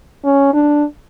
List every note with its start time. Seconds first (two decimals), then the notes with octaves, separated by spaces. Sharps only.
0.24 C#4
0.53 D4